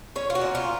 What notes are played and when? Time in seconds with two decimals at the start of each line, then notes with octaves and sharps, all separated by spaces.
0.16 C#4 C#5
0.30 F4
0.35 F#4
0.41 A#2
0.55 F4